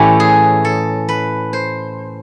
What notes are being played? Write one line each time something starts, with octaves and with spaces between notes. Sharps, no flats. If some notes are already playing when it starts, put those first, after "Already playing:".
Already playing: A2 E3 A3 C#4 G4
G#4
A4
B4
C5